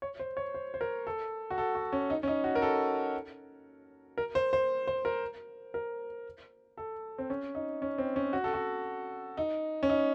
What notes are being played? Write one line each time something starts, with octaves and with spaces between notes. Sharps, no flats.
C#5
C5
C#5
C5
C5
A#4
A4
F#4
A4
F#4
C#4
D#4
C#4
D#4
F#4
A#4
A4
A#4
C5
C5
C5
A#4
A#4
A4
C4
C#4
D#4
C#4
C4
C#4
F#4
A4
F#4
D#4
C#4
D#4